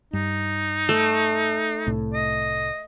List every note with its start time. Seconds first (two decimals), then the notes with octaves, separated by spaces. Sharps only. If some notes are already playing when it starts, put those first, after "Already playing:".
0.13 G2 D#4
0.89 A3
1.86 C2 A2
2.13 D#5